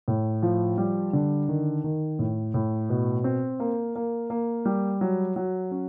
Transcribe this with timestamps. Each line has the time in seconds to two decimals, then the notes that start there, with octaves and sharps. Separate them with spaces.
0.08 A2
0.43 F3
0.78 G3
1.13 D3
1.48 D#3
1.84 D#3
2.19 A2
2.54 A2
2.89 B2
3.24 C4
3.60 A#3
3.96 A#3
4.30 A#3
4.65 G3
5.01 F#3
5.36 F#3
5.71 C#4